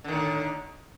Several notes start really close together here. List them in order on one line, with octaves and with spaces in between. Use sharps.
D3 D#3 A2